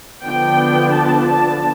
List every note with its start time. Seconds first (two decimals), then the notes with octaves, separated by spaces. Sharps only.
0.24 D3 F3 B3 D4 G5
0.92 A5
1.26 A5